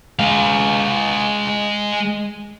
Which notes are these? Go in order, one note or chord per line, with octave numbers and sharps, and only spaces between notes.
G#3 F5